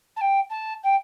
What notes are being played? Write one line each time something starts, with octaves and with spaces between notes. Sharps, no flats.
A5
G5
A5
G5